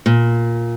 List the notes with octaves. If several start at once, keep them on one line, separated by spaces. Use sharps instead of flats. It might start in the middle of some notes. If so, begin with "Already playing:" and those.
A#2